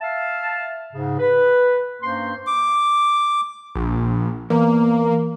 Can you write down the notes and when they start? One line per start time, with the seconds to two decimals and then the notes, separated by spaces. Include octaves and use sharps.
0.01 E5 F5 A5
0.93 G#2 C#3
1.19 B4
2.03 G2 A#3 C#4 C5 C6
2.47 D6
3.75 A#1
4.50 E2 A#3